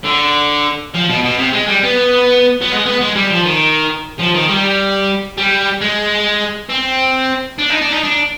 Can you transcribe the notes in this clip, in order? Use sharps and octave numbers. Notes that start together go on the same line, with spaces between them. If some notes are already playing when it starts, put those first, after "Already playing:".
D3
F3
B2
B2
C3
G#3
G3
B3
B3
G#3
B3
G#3
G3
F3
D#3
F3
D#3
G3
G3
G#3
C4
D4
D#4
D4
D#4
D4